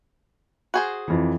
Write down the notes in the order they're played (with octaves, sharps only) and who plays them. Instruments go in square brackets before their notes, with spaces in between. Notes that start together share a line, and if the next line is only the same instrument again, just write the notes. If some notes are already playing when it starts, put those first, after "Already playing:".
[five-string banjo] F#4 G#4 C5
[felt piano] F2 E3